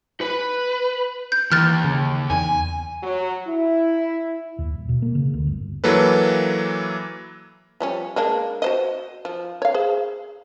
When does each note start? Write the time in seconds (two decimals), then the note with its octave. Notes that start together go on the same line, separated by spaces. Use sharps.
0.21 B4
1.32 G6
1.52 D#2 E3 F6 F#6 A6
1.84 C#3
2.30 E2 G#5
3.03 F#3
3.48 E4
4.58 D#2
4.74 D#1
4.89 B2
5.02 A#3
5.15 C#3
5.33 D2
5.47 G1
5.84 E3 F#3 A#3 A4 B4
7.80 F3 G3 C#4
8.16 G#3 A#3 D4
8.62 F#4 C5 D#5
9.25 F3
9.62 C#5 F5
9.74 G#4 C5